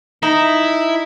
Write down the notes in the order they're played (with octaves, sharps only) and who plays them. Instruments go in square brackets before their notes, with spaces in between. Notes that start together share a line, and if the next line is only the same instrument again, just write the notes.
[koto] D#4 [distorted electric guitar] E4